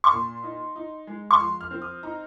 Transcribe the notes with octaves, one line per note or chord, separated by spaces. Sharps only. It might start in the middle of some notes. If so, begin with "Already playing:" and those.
C#6
A#2 C6
D#4
D#4
G#3
C#6
F3 C6
F6
C4
D#6
D#4 A#5